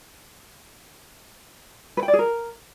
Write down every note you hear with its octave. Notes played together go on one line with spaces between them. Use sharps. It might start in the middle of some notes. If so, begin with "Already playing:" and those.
B4
G5
D5
G#4
A#4